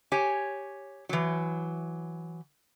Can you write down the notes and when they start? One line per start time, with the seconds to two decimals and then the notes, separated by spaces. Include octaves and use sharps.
0.12 G4 C#5 G#5
1.09 E3 F#3